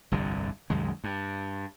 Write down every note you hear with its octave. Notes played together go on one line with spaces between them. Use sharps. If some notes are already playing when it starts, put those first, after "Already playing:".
G1 C2 F2 D3
C2 F#2 D#3 G#3
G2